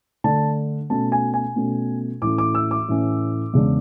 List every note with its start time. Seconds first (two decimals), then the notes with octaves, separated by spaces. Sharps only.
0.24 D3 A3 D4 A5
0.90 B2 A3 C#4 A5
1.12 G#5
1.34 G#5
1.56 B2 A3 C#4
2.22 A2 E3 A3 C#4 D6
2.38 D6
2.55 E6
2.71 D6
2.88 A2 E3 A3 C#4
3.53 E2 C#3 G#3 D4